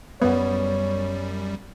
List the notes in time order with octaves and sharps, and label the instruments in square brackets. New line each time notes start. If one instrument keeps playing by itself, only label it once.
[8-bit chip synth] F#2 G3 [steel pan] B3 [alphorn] C#5